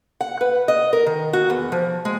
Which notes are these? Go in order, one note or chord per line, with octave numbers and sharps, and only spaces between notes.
F#5
B4
D#5
A#4
D#3
F#4
E2
F3
G#3